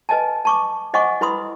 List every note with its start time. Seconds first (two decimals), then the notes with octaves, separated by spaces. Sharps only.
0.09 B4 D#5 G#5 A5
0.45 A5 C#6 D6
0.94 C5 D#5 F#5 G#5 C#6 D6
1.21 E4 B4 B5 C6 D#6